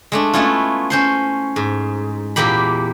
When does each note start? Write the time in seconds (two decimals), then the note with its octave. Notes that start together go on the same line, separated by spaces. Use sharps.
0.12 G#3 A3 D4
0.33 A3 B3 C#4 E4 F4
0.90 C#4 C5 C6
1.56 G#2
2.36 E2 A#2 A#3 G4 B5